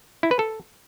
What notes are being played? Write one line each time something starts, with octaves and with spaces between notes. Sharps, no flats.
E4
B4
A4